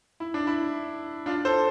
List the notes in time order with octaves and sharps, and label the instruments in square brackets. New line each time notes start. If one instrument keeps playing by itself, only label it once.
[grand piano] E4
D4
E4
D4 F4
A4 C5